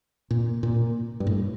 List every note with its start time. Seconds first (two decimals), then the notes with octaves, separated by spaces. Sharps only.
0.31 A#2
0.63 A#2
1.20 G2
1.27 A2